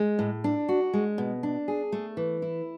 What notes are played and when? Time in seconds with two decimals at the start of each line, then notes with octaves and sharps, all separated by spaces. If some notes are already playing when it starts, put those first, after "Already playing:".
Already playing: G#3
0.19 A2
0.44 D4
0.69 F#4
0.93 G#3
1.18 B2
1.43 D4
1.68 G#4
1.92 A3
2.17 E3
2.42 E4